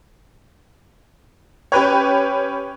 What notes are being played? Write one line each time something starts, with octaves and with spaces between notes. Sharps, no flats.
C#4 G4 B4 C#5